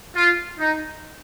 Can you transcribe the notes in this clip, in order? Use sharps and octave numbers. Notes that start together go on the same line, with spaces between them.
F4
D#4